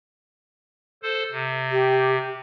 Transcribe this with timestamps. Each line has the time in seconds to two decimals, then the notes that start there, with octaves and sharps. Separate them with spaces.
1.03 A4 C5
1.32 C3
1.71 G4